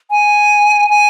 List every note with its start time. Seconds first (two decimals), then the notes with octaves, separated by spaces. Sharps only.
0.11 G#5
0.90 G#5